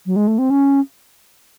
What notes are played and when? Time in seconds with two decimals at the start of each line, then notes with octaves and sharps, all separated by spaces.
0.06 F#3
0.16 G#3
0.27 A3
0.38 C4
0.50 C#4